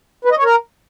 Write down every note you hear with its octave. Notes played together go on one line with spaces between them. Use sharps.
B4
D#5
C#5
A#4